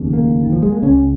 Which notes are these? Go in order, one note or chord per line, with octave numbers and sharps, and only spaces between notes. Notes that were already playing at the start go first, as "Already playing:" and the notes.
Already playing: F1 D#2 C#3
A#3
D#3
F3
G#3
A#3
C#2 C#3 C#4